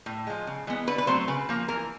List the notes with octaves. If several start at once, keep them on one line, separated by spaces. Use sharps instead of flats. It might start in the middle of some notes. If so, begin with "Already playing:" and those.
A2
F3 G#3
C#3
E3 G#3 B3
D3 B4
B4
F#3 A3 C4 C5
C#3 B4
F3 A#3
E3 A#4